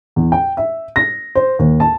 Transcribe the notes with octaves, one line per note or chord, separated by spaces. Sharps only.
E2
G5
E5
A#6
C5
D#2
A5